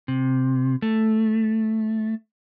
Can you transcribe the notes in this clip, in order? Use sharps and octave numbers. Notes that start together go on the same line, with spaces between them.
C3
A3